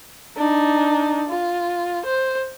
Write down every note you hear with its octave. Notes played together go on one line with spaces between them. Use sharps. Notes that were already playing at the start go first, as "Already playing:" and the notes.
D4 D#4
F4
C5